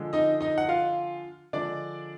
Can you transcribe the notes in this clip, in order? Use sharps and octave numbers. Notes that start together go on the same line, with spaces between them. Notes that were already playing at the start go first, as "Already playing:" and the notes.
Already playing: D3 F3 G#3
D#4 D#5
D#4 D#5
F#5
F4 F5
D3 F3 G#3 D4 D5